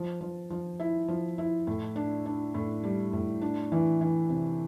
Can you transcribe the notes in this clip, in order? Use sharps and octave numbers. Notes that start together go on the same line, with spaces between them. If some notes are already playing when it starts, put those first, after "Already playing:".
Already playing: F3
F3
F3
E4
F3
E4
A2
D4
D4
A2
G3
A2
D4
E3
E3
C3